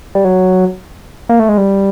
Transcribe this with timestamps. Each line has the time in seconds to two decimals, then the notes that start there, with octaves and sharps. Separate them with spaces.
0.15 G3
0.25 F#3
1.29 A#3
1.39 A3
1.49 G#3
1.58 G3